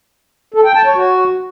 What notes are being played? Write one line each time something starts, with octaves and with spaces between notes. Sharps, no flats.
A4
G5
A5
C#5
F#4